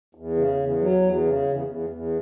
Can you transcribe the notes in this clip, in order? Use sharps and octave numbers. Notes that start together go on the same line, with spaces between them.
E2
C#3
E2
F#3
E2
C#3
E2
E2
E2